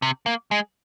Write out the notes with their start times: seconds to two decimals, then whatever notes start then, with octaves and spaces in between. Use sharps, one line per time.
0.02 C3
0.26 A#3
0.51 G#3